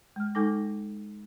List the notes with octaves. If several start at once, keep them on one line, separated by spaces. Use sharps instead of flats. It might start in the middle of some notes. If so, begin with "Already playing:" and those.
G#3 F6
G#3 D#4 A4 G#5 D6 A#6